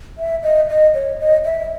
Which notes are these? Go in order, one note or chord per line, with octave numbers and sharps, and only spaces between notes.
E5
D#5
D#5
C#5
D#5
E5